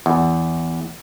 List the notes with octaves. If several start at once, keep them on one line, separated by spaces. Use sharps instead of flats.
E2